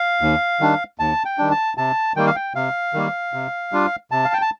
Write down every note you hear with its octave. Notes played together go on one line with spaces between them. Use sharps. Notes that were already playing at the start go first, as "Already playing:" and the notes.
Already playing: F5
D#2
D#3 G3 D4
D#2 A5
G5
D#3 G3 D4
A5
C3 A5
D#3 G3 A#3 G5
F5
G5
C3 F5
D#3 G3 A#3
C3
G3 D4 F4
C3 A5
F5
G5
A5